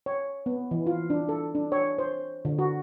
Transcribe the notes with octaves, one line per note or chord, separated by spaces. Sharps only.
C#5
B3
E3
F4
D4
A4
D4
C#5
C5
D3
F#4